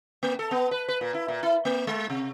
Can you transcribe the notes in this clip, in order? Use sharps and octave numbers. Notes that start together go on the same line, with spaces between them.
A#3
A4
B3
B4
B4
A#2
E4
A#2
E4
A#3
G#3
C3